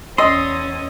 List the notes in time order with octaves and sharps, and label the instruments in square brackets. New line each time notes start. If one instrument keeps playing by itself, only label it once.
[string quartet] E2 C#4 [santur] D#5 [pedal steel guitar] C6 [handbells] E6 A6